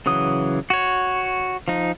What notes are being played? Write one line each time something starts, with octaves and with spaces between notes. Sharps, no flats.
C#3 E3 F#3 D#6
F#4 C#5
F3 D#4